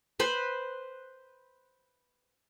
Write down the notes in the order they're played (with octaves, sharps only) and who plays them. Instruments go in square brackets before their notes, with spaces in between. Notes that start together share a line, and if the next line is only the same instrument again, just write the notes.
[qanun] B4 C5 B5